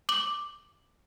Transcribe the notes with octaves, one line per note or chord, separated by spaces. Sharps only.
D6 F#7